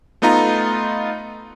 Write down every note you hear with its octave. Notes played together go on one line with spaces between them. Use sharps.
A3 B3 D#4 F4 A#5